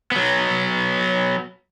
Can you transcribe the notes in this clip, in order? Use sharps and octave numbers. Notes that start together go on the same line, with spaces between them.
F#3 B3